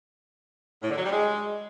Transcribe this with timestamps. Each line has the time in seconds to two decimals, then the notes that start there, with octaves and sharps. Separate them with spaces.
0.82 A2
0.89 D3
0.97 F#3
1.04 G3
1.12 G#3